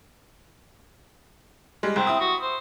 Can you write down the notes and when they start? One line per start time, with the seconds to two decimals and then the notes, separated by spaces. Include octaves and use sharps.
1.83 G3 G#3
1.96 C2 C4
2.07 E4 D#6
2.20 F#4
2.42 C5